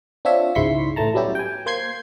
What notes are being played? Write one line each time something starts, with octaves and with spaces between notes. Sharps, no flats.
C4 D4 F4 C#5 E5
C#2 G#2 E4 C6 C#6 B6
A2 E3 A3 A5 A#5
F#3 G3 B3 C#4 E4 G4
G5 G#5
A#3 C5 G6 G#6 C7